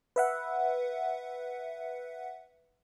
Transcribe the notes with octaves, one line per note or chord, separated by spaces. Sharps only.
B4 E5 F#5